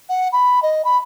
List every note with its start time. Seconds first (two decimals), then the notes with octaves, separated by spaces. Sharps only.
0.09 F#5
0.32 B5
0.62 D#5
0.84 B5